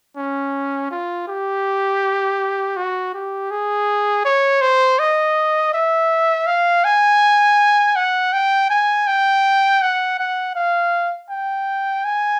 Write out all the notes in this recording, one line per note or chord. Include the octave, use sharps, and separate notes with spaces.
C#4
F4
G4
F#4
G4
G#4
C#5
C5
D#5
E5
F5
G#5
F#5
G5
G#5
G5
F#5
F#5
F5
G5
G#5